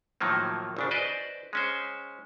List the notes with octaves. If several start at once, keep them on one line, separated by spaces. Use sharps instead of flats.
A2 D#3 F3 F#3 A#3
G#1 C#3 D4
B4 C5 D5 D#5
G#3 C#4 C5